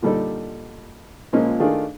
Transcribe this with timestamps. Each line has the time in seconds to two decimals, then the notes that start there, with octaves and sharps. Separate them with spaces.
0.02 A#2 D3 G3 D#4 A4
1.33 A#2 F3 G#3 A#3 C#4
1.60 D#3 A3 D4 F4 G#4